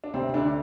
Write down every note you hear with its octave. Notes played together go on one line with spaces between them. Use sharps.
D4
D2 C3 C4
D2 D3 D4